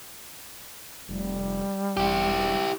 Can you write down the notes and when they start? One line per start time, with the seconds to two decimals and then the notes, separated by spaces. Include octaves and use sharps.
1.09 F1 G3
1.97 E1 E4 G4